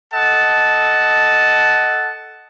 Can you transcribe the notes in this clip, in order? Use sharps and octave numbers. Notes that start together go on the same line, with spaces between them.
A4 D#5 F#5 A5